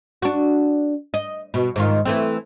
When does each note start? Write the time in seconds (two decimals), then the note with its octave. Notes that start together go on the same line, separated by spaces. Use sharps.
0.22 D4 F#4
1.14 D#5
1.54 B2
1.76 G#2 D#3 F4
2.05 E3 A3 C4